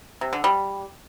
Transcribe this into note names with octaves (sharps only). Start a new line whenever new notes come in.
C3
D3
G3